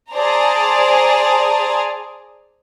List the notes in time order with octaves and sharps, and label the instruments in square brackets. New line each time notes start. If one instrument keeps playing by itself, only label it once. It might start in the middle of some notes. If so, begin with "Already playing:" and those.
[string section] G#4 C5 D5 A5 A#5